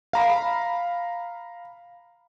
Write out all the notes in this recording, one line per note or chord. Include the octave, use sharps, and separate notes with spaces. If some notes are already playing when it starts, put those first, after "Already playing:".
F5 A#5 B5